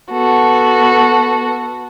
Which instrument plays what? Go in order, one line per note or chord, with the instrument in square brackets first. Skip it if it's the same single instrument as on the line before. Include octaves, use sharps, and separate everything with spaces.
[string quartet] B3 F#4 A4